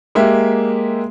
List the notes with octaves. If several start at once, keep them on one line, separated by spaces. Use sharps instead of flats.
G#3 A#3 G4 E5